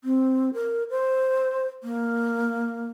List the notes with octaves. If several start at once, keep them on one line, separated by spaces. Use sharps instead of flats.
C4
A#4
C5
A#3